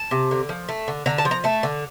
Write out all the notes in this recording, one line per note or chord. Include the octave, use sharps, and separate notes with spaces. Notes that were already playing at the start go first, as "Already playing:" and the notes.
Already playing: A5
C3
D3
F3
A3
D3
D3 A#5
A5
F3
A#5
A3 A5
D3